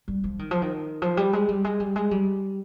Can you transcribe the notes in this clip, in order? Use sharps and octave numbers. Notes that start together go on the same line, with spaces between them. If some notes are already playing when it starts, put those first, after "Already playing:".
G3
F3
D#3
F3
D#3
F3
G3
G#3
G3
G#3
G3
G#3
G3